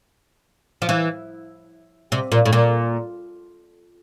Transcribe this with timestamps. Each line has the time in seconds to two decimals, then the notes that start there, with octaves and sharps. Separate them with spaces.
0.82 F3
0.89 E3
2.12 C3
2.32 A#2
2.46 A2
2.53 A#2